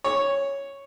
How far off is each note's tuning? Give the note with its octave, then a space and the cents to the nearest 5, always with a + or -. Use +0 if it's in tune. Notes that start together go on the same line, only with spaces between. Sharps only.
C#5 +0